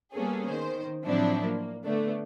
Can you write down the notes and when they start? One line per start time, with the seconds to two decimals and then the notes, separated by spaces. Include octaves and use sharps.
0.13 G3 A#3 B3 C#4 G#4 A4
0.48 D#3 C5
1.05 A2 F3 F#3 C4 D4 E4
1.45 A#3
1.84 D3 A3 B3 D4